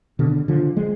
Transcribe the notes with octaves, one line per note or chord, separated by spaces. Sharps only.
B2 D3
D3 F3
F3 G#3